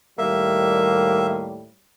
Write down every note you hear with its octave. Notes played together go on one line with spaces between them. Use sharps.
D#2 A2 G3 A#3 E5